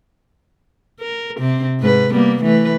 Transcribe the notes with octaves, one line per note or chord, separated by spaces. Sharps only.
A#4
C3 C4
G#2 B4
G3 A#3 B3
E3 A3 B4